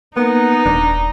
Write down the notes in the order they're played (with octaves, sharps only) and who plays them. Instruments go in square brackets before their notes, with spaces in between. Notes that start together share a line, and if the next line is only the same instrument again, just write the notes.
[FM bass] A#3 [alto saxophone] B3 [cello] D#4
[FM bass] D#1 [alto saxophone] D4